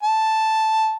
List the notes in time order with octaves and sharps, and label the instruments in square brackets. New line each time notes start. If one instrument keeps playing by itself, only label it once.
[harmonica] A5